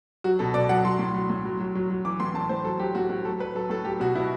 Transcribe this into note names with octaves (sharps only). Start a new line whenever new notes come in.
F#3 F#4
B2 A4
B2 D5
F#3 F#5
F#3 C6
A2
F#3
A2
F#3
F#3
F#3
F#3
E3 D6
A2 C6
A2 A5
A2 C5
F#3 A4
F#3 G4
A2 F#4
A2 F#4
F#3 A4
F#3 B4
F#3 A4
A2 A4
F#3 G4
B2 F#4
B2 E4